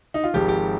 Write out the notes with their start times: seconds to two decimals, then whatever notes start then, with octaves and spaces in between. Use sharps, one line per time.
0.14 D#4
0.24 F4
0.34 G#1 G#2 F3 G4
0.49 G4